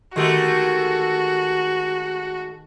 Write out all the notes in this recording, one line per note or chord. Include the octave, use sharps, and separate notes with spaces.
D#3 G#3 A3 F#4 G4